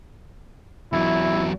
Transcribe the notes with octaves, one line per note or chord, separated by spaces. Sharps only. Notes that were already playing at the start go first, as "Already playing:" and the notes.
E2 F#3 E4